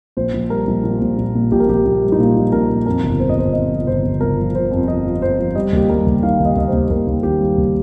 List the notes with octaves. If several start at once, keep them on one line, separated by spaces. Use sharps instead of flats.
A#1 C5
A#1
G3 A#4
A#1
A#2
A#1
A#1
A#2
A#1 G4
A#4
A#1 G4
A#1
G3
D#4
A#2 F4
A#1
A#1 A#4
A#1
F2 A#4
G1
F2 C5
D#5
G1 C5
F2 D#5
F3
G1 C5
G1
G1 A#4
F3
F3 C5
F2
F2 D#5
F3
F2 C5
F3
G3 D#5
D#2 G4
G3 A#4
D#2
D#3 F5
D#2
D#5
D#2 D#5
D#2 C5
D#2 A#4
D#2
D#3 G4
G3
D#2